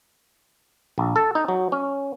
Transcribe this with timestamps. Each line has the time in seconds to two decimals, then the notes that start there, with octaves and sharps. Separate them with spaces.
0.98 A#1
1.16 A4
1.35 D#4
1.48 F#3
1.72 C#4